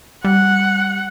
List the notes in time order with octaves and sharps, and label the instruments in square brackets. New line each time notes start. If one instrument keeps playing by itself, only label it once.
[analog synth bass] G3 [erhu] F#5